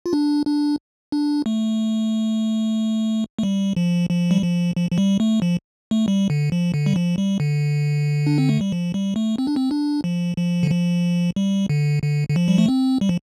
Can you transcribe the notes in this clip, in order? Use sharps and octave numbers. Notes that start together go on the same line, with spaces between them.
F4
D4
D4
D4
A3
A3
G3
F3
F3
G3
F3
F3
F3
G3
A3
F3
A3
G3
D3
F3
D3
G3
F3
G3
D3
D4
C4
A3
G3
F3
G3
A3
C4
D4
C4
D4
F3
F3
D3
F3
G3
D3
D3
D3
F3
G3
A3
C4
G3
F3